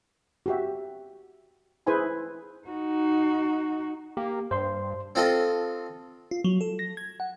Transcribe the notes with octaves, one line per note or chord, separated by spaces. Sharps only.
F#4 G4 E5
E4 G#4 B4 C5 G#5 B5
D#4 F#4
A#3 G4
G2 C5 C6
C4 F4 A4 D#5
F4
F#3
A4
A#6
G#6
F#5